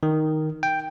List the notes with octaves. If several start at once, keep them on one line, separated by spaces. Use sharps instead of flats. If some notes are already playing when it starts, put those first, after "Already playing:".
D#3
G5